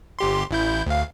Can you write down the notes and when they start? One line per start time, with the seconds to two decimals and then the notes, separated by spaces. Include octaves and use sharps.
0.19 G1 G4 C6
0.51 A1 E4 G6
0.86 D2 F5